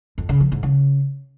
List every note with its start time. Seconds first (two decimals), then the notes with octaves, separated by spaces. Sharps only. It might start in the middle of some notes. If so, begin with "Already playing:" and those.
0.18 F2
0.29 C#3
0.40 F3
0.52 G#2
0.63 C#3